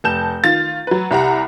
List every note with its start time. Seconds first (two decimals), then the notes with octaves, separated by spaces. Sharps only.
0.04 F1 A5 G6 E7
0.44 D#3 F4 A6
0.87 F#3 B4
1.11 C2 G4 F#5 A#5